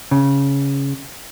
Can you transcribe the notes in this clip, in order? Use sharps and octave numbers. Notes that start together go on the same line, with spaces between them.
C#3